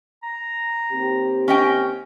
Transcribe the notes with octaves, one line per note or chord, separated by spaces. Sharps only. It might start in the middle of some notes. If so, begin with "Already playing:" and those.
A#5
D#2 C4 G4
C#4 D#5 G5